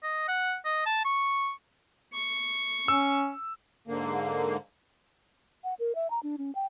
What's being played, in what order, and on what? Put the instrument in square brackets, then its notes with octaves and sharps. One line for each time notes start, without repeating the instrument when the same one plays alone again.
[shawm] D#5
F#5
D#5
A5
C#6
[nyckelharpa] C#6
[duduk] C#4 [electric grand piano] E6
[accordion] G#2 D3 A#3
[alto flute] F#5
A#4
E5
A#5
D4
C#4
G5